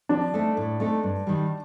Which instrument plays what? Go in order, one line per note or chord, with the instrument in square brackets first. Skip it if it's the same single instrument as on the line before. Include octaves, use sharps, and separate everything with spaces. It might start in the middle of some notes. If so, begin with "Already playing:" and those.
[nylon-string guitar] F3 [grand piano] D4
[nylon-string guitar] A3 C4 D#4 A4
A2
A3 C4 D#4 A4
G2
D#3 G3